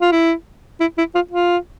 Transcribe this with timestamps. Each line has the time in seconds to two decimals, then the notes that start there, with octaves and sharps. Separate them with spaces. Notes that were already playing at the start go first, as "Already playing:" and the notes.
0.02 F4
0.12 E4
0.80 E4
0.98 E4
1.15 F4
1.31 F4